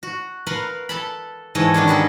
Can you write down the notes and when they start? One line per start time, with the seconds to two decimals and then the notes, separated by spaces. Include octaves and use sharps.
0.03 F#4
0.46 A#4 B4 F5 F#5 B5 C6
0.89 A4 A5 B5
1.55 G#2 E3 A4 C#5 D#5 G5
1.74 D#3 B3 C#4 D4
1.88 D3 G3 D#4 A4